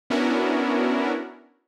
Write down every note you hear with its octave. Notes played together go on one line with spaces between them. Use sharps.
B3 C#4 D4 E4 F#4 A#4